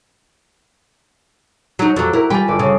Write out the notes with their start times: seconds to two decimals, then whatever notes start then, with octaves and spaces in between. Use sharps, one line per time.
1.79 F#3 D#4
1.96 F2 F#3 F#4 G4
2.13 E4 A#4
2.30 G3 F4 G4 G#5 B5
2.48 G1 A4 D5
2.59 C#3